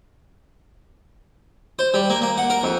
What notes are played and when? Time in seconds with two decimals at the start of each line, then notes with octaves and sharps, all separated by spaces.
1.79 C5
1.94 G3
2.10 A#3
2.22 A#3
2.38 F#5
2.50 A#4
2.63 F2